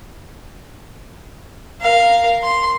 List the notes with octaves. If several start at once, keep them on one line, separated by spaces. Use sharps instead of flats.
A#4 F5
C6